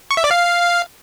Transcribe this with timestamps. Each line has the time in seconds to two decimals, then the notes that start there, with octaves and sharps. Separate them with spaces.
0.11 C#6
0.17 E5
0.24 D5
0.31 F5